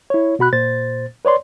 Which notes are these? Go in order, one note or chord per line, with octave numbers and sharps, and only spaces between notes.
E4 C#5
B2 F#4 B5 F#6
A#2 C5 A6
B4 C#5 D5 C6